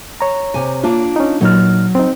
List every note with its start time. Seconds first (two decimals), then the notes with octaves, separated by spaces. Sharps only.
0.21 C#5 A#5
0.54 C3 G#5
0.83 A#3 D4 F4
1.16 C#4 D#4
1.41 A#2 F#3 D#4 F6
1.95 C4 D#4